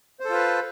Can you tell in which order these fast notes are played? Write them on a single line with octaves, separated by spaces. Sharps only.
C5 A4 F4 B4